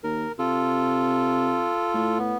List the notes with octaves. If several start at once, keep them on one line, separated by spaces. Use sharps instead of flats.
D#2 A#4
C3 F4 A4
A2
B3